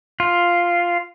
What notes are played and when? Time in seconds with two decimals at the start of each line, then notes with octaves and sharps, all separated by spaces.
0.20 F4